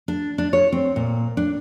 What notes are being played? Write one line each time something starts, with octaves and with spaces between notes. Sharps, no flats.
D4
D4
C#5
C4
A#2
D4